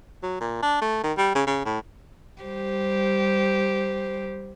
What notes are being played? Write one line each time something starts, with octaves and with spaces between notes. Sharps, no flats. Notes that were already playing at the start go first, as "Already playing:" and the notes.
F#3
A#2
D4
A3
D#3
G3
C#3
C#3
A2
G3 G4 C5